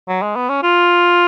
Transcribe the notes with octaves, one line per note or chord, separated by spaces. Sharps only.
F#3
G#3
B3
C#4
F4